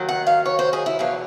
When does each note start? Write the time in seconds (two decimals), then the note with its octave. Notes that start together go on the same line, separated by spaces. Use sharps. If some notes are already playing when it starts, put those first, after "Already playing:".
Already playing: D#2 D#3 F#3
0.09 F#5
0.27 F5
0.46 C#5
0.59 C5
0.73 G#4
0.86 E4
0.99 E2 B2 F#3 F4